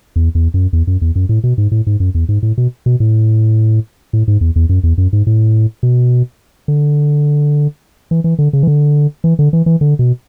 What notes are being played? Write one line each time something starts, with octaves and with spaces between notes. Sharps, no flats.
E2
E2
F#2
E2
F#2
E2
F#2
A2
B2
G#2
A2
G#2
F#2
E2
G#2
A2
B2
B2
A2
A2
G#2
E2
E2
F#2
E2
F#2
G#2
A2
B2
D3
E3
E3
D3
C#3
E3
D3
E3
D3
E3
E3
D3
B2